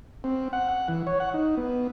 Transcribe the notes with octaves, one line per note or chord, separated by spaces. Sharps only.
C4
F#5
F#5
E3
C#5
F#5
D#4
B3